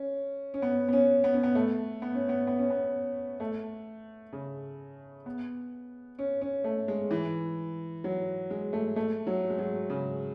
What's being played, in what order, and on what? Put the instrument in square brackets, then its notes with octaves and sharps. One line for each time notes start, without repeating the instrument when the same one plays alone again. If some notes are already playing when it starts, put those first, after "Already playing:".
Already playing: [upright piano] C#4
C#4
B3
B3
C#4
B3
C#4
B3
A3
B3
C#4
B3
B3
C#4
B3
A3
C#3
B3
C#4
C#4
A3
G#3
E3
F#3
G#3
A3
A3
F#3
G#3
F#3
C#3